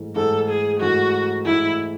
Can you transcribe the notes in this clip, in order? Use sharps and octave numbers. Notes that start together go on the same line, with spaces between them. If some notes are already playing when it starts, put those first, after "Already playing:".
Already playing: G#2 E3 A3
G#2 E3 A3 A4
G#4
G#2 E3 A3 F#4
G#2 E3 A3 E4